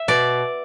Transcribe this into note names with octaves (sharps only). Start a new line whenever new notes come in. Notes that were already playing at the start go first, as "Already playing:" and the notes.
Already playing: E5
B2 D5